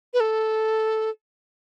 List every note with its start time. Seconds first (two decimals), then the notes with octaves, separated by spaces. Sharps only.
0.14 B4
0.20 A4